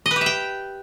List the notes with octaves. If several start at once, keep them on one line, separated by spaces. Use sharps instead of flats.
D#5
B4
G4
E5
G5